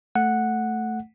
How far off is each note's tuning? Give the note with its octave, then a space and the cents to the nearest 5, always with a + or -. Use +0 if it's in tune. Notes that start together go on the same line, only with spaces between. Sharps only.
A3 +0 F#5 -5